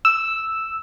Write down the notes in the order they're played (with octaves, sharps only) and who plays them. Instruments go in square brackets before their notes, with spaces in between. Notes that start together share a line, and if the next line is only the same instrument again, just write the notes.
[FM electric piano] E6